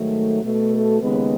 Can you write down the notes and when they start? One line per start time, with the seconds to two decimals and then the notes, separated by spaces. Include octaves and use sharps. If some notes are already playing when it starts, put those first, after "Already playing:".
Already playing: G#2 D#3 F#3 A3
0.43 B2 A3
0.72 A4
1.01 D#2 C#3 G#3 B3 B4